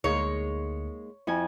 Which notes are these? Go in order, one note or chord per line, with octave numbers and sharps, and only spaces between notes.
D2 G#3 A#3 D#4 C#5 C#7
F2 E4 G#5